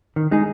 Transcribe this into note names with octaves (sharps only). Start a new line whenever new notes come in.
D#3
G#3 D#4 G#4